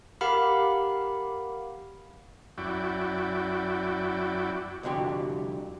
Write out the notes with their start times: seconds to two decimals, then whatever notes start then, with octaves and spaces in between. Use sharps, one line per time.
0.21 G4 A#4 F5 F#5 B5 D6
2.58 F#2 E4 F#4 D5 G5
4.83 C2 F2 D3 F#4 G4